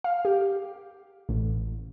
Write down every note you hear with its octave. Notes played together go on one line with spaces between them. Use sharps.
F5
G4
A1